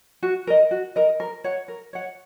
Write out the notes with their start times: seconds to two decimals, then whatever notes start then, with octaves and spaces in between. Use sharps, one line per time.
0.23 F#4
0.47 A#4 D#5
0.71 F#4
0.96 A#4 D#5
1.20 A#4
1.44 C#5 F#5
1.68 A#4
1.93 C#5 F#5